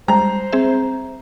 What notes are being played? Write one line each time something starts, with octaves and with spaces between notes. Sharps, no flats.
G3 G#3 C5 A#5
C4 G#4 E5